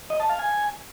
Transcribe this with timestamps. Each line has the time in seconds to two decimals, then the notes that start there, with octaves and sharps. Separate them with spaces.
0.10 D#5
0.20 A5
0.29 F5
0.39 G#5